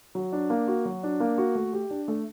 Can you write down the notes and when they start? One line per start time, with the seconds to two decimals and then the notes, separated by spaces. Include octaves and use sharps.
0.15 F#3
0.32 D4
0.50 A#3
0.68 F#4
0.85 F#3
1.03 D4
1.20 A#3
1.38 F#4
1.55 A3
1.73 G4
1.90 D4
2.08 A3